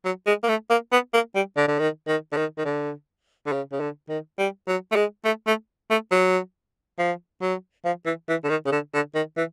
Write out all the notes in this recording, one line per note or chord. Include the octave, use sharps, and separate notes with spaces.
F#3
G#3
A#3
A3
A#3
B3
A#3
G3
D3
D3
D#3
D#3
D3
D#3
D#3
D3
D3
C#3
C#3
D3
D#3
G3
F#3
A3
G#3
A3
A3
A3
F#3
F3
F#3
F3
E3
E3
D3
D#3
C#3
D3
D3
D#3
E3